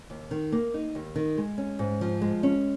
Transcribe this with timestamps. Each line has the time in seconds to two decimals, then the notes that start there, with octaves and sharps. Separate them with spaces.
0.10 D#2
0.31 D#3
0.52 A#3
0.74 D#4
0.95 D#2
1.16 D#3
1.37 G#3
1.58 C#4
1.79 G#2
2.01 F3
2.21 G#3
2.43 C#4